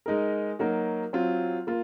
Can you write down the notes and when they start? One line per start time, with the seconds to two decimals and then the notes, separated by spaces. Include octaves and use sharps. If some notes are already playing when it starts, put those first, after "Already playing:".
0.06 G#3 D#4 A#4
0.59 F#3 A#3 D#4 F#4 A#4
1.13 F#3 C4 F4
1.67 A#3 F4